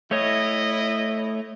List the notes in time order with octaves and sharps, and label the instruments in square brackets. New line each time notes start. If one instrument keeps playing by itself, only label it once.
[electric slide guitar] A3 C#5 [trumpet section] E4 D#5